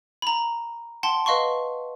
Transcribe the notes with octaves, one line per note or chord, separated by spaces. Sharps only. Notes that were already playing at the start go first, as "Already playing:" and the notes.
A#5 B5
F#5 G5 A5 C6 G7
B4 D#5 F5 C6 C#6